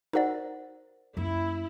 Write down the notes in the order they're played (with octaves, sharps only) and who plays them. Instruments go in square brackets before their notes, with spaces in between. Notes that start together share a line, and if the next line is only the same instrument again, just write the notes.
[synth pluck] D#4 F#4 D5 [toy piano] A#4 C5 F#5
[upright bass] F#2 A#3 [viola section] E4